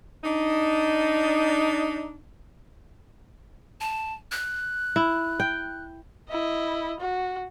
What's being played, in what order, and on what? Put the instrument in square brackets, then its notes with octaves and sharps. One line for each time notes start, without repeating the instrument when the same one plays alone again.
[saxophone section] D4 D#4
[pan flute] A5
F#6
[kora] E4
G5
[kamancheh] E4 D#5
F#4